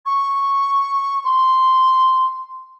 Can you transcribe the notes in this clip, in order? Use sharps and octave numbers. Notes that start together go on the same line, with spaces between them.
C#6
C6